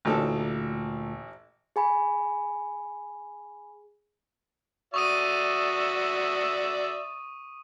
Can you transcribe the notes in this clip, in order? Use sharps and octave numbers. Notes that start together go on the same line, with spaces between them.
A1 D2 A#2 D#4 A4
G#4 G#5 B5
F#4 D5 E5 C#6 D#6 D#7